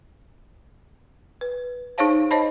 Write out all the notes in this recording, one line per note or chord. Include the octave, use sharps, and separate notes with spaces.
B4
D#4 G#4 C5 C#5 F5 A5
C5 C#5 D#5 A5 B5